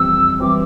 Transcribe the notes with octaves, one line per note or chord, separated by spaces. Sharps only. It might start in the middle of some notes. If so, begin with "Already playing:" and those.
Already playing: F2 E3 G3 C4 E6
E3 G3 C4 D6